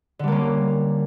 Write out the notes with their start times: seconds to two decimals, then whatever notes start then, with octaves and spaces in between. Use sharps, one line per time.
0.19 D3
0.24 G3
0.28 A#3
0.32 C#4